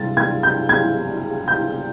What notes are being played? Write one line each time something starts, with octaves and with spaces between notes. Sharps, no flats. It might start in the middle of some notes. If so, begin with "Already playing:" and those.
Already playing: C3 G3 A6
G#6
G6
G#6
G6